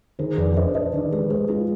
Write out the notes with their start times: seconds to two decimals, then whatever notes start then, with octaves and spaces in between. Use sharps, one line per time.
0.19 D#3 G#4 C5
0.37 F2 B4 D5
0.57 D4 C5 D#5
0.75 D4 C5 D#5
0.93 D#3 B4 D5
1.12 G#3 G4 B4
1.30 G#3 G#4 C5
1.49 G#3 F4 G#4